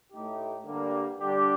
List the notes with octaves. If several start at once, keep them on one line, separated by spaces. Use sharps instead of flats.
A2 A3 D#4 G4
G2 D3 G3 A#3
D3 G3 D4 G4